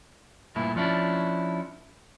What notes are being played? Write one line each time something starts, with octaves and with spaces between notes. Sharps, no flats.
D2 G2 A#2 E4
F3 C#4 D4 E4